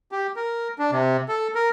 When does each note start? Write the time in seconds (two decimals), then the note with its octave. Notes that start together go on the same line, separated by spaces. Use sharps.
0.12 G4
0.36 A#4
0.79 D4
0.92 C3
1.29 A4
1.55 A#4